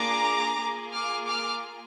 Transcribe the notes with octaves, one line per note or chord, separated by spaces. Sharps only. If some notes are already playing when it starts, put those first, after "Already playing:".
Already playing: A#3 D4 F4 G#4 A#5 D6
A#3 F4 G#4
D6 F6
D6 F6